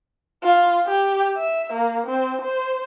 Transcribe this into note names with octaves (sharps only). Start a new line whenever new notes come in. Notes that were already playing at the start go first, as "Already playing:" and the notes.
F4
G4
E5
A#3
C4
C5